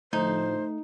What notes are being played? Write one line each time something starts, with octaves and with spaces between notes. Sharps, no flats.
A2 D3 F3 A3 D#4 C5